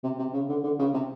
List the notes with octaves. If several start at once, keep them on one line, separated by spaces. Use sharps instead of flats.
C3
C3
C#3
D3
D3
C#3
C3